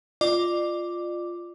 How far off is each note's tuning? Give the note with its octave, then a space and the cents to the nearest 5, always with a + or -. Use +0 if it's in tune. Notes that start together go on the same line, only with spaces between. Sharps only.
F4 +0 D5 +35 D6 +0